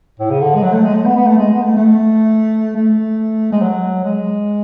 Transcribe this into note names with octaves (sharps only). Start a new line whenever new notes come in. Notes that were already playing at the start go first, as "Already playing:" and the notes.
A2
C#3
D3
G#3
F#3
A3
G#3
A3
B3
B3
A3
G#3
B3
A3
A3
A3
G#3
F#3
G#3